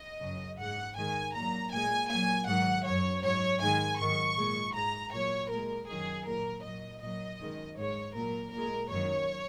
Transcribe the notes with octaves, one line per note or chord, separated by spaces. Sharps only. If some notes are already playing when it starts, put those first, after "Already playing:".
Already playing: D#5
F#2 C#3 F#3
G#2 G#3 F#5
G#2 D#3 G#3 G#5
A#2 F#3 A#5
A#2 G#3 G#5
A#2 F#3 G#5
G#2 D#3 F#3 F#5
F#2 F#3 C#5
G#2 F#3 C#5
G#2 D#3 G#3 G#5
G#2 D#3 F#3 C#6
A#2 G#3
G#2 G#3 A#5
A#2 F#3 C#5
A#2 G#3 A#4
F#2 D#3 F#3 G#4
A#2 F#3 A#4
A#2 F#3 D#5
A#2 F#3 D#5
F#2 D#3 G#3
G#2 G#3 C#5
A#2 F#3 A#4
A#2 G#3 A#4
F#2 D#3 F#3 C#5